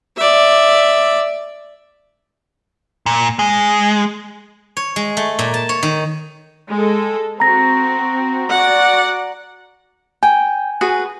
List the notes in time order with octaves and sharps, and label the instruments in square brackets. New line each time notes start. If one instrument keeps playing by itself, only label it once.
[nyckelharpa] D5 E5
[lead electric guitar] A#2
G#3
[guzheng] C#5
G#3
A3
A#2
A5
C#5
D#3
[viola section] G#3 A4
[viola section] C4 F#4 [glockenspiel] A#5 A#6
[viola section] F#4 D5 F#5
[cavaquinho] G5 [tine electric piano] G#5
[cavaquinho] F#4 G#4 B4